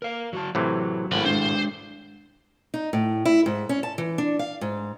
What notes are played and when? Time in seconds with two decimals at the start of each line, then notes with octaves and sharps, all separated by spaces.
0.02 A#4 F5
0.33 F#3 F#4 A5
0.55 A2 C3 E3 F#3
1.12 G#1 A2 G#3 B5
1.25 G#3 D4 C5
2.74 D#4
2.93 A2
3.25 E4
3.46 G#2
3.69 C#4
3.83 A5
3.98 E3
4.18 D4
4.39 F5
4.61 G#2